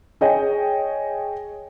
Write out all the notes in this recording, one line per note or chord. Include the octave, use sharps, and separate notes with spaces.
G#4 C#5 D#5 G5 G#5